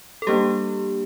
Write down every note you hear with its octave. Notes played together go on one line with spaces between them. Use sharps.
A4
G3 A#3 D4 G4